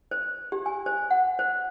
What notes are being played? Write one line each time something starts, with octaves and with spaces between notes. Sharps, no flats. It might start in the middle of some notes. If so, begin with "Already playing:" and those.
C5
G4
G#5
C5
F#5
C5